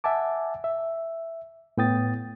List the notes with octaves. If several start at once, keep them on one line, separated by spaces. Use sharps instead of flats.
E5 F#5 G#5 A5 D6
E5
A2 B3 G5 D#6 A6